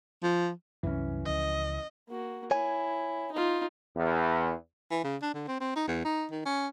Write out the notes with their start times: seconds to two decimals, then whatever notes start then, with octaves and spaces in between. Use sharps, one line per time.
0.23 F3
0.83 C2 F#2 E3 C#4
1.26 C#2 F3 D#5
2.08 A#3 F#4
2.51 E4 C#5 G#5
3.32 D#4 F4
3.96 E2
4.91 E3
5.04 C#3
5.22 D4
5.34 D3
5.48 C4
5.60 C4
5.75 D#4
5.88 E2
6.05 D#4
6.31 D#3
6.45 C#4